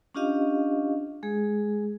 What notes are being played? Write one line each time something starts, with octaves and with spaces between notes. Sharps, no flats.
C#4 D4 F4 G4 D#5 F5
G#3 G#4